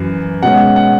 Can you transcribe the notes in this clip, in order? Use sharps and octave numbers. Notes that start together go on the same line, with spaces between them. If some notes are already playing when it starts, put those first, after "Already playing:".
Already playing: F#2 E3
B2 G#3 C#4 F#5
F#5